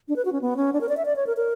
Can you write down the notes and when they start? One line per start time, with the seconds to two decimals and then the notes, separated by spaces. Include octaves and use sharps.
0.08 D4
0.16 B4
0.25 F#4
0.33 C#4
0.41 B3
0.57 C#4
0.73 D4
0.81 A#4
0.89 D5
0.97 E5
1.06 D5
1.16 C#5
1.27 A#4
1.37 A#4